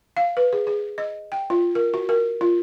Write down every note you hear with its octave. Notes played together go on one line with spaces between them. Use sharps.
F5
B4
G#4
G#4
D#5
G5
F4
A#4
F#4
A#4
F4